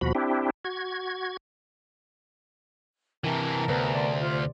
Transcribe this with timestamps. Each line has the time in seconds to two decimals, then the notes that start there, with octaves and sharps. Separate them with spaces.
0.01 D#2 B2 F3 F#4 B5
0.15 C4 D4 E4 G4
0.65 F#4 G#6
3.24 C3 E3 A#4 A5 A#5
3.68 D2 C3 B3
3.95 D5 C6
4.20 F4 C5